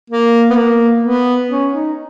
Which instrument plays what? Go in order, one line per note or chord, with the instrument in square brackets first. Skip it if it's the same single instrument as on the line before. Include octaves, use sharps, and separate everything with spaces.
[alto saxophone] A#3
B3
A#3
B3
C#4
D#4